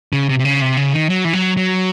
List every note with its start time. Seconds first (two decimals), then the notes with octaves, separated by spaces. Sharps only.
0.13 C#3
0.29 C3
0.39 C3
0.45 C#3
0.61 C3
0.77 C#3
0.93 D#3
1.10 F#3
1.25 E3
1.33 F#3
1.57 F#3